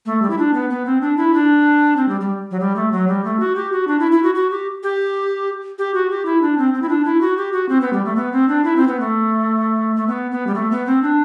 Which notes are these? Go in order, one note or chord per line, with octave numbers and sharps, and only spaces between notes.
A3
G3
E4
D4
B3
B3
C4
D4
E4
D4
C4
G3
G3
F#3
G3
A3
F#3
G3
A3
F#4
G4
F#4
D4
E4
E4
F#4
F#4
G4
G4
G4
F#4
G4
E4
D4
C4
C4
E4
D4
E4
F#4
G4
F#4
C4
B3
G3
A3
B3
C4
D4
E4
C4
B3
A3
A3
B3
B3
G3
A3
B3
C4
D4